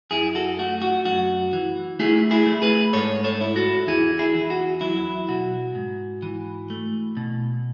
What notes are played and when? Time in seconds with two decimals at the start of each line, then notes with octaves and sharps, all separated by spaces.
0.11 F#2 E4 G#4
0.35 F#4 A4
0.59 A3 F#4
0.82 F#4
1.05 F#2 F#4
1.53 E3
2.00 A3 E4 G#4
2.31 E4 G#4
2.46 A3
2.62 G#4 B4
2.93 G#2 A4 C#5
3.24 A4 C#5
3.41 E4
3.56 F#4 A4
3.87 E2 E4 G#4
4.19 E4 G#4
4.35 E3
4.50 F#4
4.81 F#3 E4
5.29 B2 F#4
5.75 G#2
6.22 E3
6.70 A3
7.17 B2